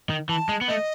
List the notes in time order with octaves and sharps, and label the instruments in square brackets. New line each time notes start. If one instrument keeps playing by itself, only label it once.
[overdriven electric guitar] D#3
[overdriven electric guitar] E3 [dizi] A5
[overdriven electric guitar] G#3
B3
[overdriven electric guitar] A3 [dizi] D#5